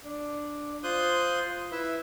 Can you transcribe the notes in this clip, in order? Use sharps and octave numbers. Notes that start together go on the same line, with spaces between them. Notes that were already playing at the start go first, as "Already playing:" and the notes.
D4
F4 C5 D#6 F#6 G6
E4 B4 E5